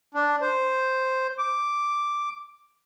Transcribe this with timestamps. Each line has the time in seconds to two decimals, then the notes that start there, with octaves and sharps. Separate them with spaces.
0.14 D4
0.41 C5
1.39 D6